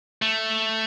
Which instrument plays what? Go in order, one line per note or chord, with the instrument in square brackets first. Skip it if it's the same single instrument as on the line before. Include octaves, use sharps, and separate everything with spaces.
[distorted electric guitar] A3